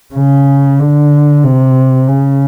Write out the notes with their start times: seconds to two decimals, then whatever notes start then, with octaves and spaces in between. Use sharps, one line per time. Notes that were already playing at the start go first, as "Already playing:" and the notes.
0.15 C#3
0.79 D3
1.43 C3
2.08 C#3